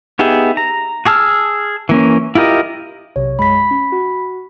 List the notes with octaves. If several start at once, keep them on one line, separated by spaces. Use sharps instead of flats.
B3 D#4 G4 G#4 E5
A#5
F#4 G#4 A5 E6 F6
E3 A#3 C#4
E4 F4 G4 A#4 D#5
B1 C3 C#5
F#2 G#3 B5 B6
C#4
F#4